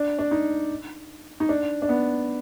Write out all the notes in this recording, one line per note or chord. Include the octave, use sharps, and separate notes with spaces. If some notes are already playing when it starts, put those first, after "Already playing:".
Already playing: D4
D4
D#4
D#4
D4
D4
B3